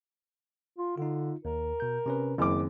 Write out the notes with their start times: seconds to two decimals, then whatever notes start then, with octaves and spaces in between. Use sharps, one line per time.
0.78 F4
0.98 D3 D#4 F4
1.45 D#2 A#4
1.80 B2 G6
2.06 C3 C#4 B4
2.38 F#1 D#3 C4 G#4 D6